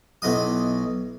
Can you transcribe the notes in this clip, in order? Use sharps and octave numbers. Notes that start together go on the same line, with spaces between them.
B1 E4 D#5 D#6